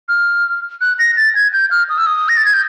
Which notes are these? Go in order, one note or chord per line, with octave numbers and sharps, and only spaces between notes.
F6
F#6
A#6
A6
G#6
G6
F6
D#6
E6
D#6
A#6
A6
G#6
G6